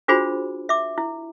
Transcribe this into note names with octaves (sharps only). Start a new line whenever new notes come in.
D4 F4 F#4 G#4 C5 B5
E5 D6
E4